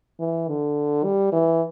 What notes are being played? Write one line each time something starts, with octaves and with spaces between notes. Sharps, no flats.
E3
D3
G3
E3